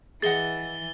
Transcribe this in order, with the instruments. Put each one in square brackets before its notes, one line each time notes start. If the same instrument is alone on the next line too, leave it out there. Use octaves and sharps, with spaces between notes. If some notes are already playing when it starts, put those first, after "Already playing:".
[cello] E3 [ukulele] G#4 D#5 F#5 [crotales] A6 G7